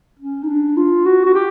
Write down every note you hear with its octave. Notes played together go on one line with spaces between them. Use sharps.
C#4
D#4
D4
F4
F#4
F#4
G4